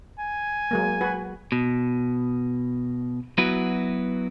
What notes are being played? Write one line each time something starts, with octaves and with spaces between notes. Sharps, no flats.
G#5
F#3 G#3 A#3
F#4 B4
B2
F#3 B3 E4 F#4 B4